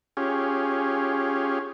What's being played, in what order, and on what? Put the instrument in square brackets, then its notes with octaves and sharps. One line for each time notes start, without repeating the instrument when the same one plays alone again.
[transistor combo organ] C#4 F4 G4 G#4